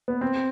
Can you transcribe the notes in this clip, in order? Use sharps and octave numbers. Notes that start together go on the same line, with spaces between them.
B3
C4